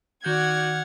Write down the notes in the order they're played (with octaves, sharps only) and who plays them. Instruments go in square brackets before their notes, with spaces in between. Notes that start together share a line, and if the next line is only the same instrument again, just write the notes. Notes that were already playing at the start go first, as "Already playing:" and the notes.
[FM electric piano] D#3 G6 [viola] F#4 D5 [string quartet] F#5 F6 G#6